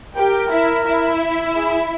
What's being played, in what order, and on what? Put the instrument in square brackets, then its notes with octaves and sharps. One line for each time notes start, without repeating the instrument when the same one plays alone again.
[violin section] G4 G5 [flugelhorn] A#4
[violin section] E4 E5
E4 E5
[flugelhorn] G#4